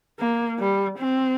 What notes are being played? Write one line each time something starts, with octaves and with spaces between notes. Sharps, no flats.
A#3
G3
C4